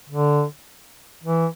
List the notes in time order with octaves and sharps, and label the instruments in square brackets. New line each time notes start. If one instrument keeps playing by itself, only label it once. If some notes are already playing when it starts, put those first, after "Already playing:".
[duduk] D3
E3